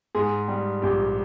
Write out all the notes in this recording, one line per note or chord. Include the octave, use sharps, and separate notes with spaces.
G#2 G#4
G3
A#1 G4